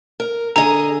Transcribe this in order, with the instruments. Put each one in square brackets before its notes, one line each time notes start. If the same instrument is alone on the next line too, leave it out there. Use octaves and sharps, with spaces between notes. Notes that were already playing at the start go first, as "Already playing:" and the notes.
[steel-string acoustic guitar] A#4
[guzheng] D3 [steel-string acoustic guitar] G#4 D#5 [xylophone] A#5